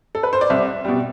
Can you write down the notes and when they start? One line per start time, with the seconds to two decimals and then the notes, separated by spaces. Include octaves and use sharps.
0.15 A4
0.23 B4
0.33 C5
0.41 D5
0.50 C2 E5
0.85 B2 G3